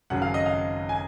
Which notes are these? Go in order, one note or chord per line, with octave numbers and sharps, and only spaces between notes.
G#1 F#2 C#3 F#3 F#5
F5
D#5
F5
G#5